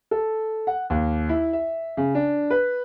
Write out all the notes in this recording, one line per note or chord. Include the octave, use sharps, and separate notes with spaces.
A4
F#5
D#2
E4
E5
C#3
D4
B4